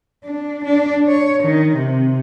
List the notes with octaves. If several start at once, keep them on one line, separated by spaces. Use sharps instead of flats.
D4
D4
C#5
D#3
C3